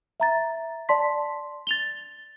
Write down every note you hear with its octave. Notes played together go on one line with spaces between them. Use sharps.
E5 A#5 A6
D5 A5 C6 B6
A6 F7 G7